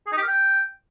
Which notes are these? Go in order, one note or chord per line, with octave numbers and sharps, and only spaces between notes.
G#4
D#4
G4
A#4
G5